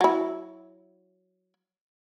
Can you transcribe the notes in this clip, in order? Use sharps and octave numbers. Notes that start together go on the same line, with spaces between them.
F#3 E4